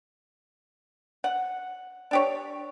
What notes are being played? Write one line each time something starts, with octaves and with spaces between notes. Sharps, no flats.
F#5
D4 G4 C#5